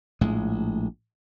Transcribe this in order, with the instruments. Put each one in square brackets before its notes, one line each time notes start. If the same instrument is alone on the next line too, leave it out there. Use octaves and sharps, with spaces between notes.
[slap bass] A#1 A2 G#3